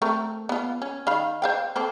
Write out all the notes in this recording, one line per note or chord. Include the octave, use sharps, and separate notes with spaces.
A3 C4 A#4
B3 F4
C#4
D#3 F5 B5
C5 F5 G5
A#3 C4 A4